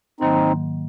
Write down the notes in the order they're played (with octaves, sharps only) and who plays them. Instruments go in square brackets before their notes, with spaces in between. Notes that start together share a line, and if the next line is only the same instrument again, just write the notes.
[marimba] G#2 D#3 F#3 A#3 [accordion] C4 D#4